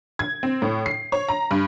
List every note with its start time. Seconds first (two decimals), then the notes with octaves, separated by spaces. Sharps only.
0.19 G#6
0.43 C4
0.62 A2
0.86 C7
1.12 C#5
1.29 A#5
1.51 G2